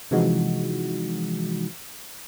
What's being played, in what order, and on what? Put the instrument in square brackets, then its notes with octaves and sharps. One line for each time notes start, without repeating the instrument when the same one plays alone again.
[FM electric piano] C3 E3 F3 G#3 D#4 F#4